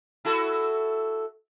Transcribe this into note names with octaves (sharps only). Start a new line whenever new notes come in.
E4 F#4 A4